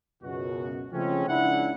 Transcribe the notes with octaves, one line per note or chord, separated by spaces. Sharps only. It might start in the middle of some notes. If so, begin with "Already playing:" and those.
C#2 F#2 B2 F#4
C#3 F3 G#3 A3 C4 C#4
C#2 D4 E4 F#5